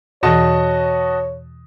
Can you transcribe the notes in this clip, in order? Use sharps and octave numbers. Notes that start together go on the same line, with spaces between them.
E2 B2 E3 F#4 C#5 D#5 A5